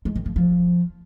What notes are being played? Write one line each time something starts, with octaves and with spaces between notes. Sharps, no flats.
G#3
D#3
F3
F3